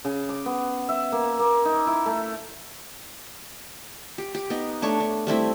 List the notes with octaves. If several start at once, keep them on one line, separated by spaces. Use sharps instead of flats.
C#3
D6
B3
E5
A#3
A#3
D#4
E4
A3
G4
G4
B3 D#4
A3 D4 C#5 C#6
D4
G3 A3 C4 E4